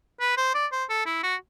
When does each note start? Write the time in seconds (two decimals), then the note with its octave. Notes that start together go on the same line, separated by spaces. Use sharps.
0.20 B4
0.37 C5
0.54 D5
0.72 C5
0.89 A4
1.06 E4
1.23 F#4